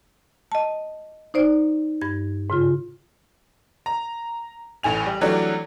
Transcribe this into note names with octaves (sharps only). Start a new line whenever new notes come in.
D#5 A5
D#4 C5 D5
G2 G#6
G#2 C#3 F4
A#5
A1 A2 G#5 F7
G3
E3 F#3 G3 A3 D4 F#4